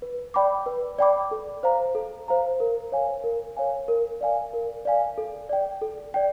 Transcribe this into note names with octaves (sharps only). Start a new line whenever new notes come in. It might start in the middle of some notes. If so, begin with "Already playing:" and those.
B4
D5 G5 B5 D6
B4
D5 G5 B5 D6
A4
C5 F5 A#5
A4
C5 F5 A#5
A#4
C#5 F5 G#5
A#4
C#5 F5 G#5
A#4
D5 F5 G#5
A#4
D5 F5 G#5
A4
D5 G5
A4
D5 G5